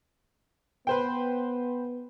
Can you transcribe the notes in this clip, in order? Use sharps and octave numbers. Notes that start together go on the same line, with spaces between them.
B3 B4 C5 G5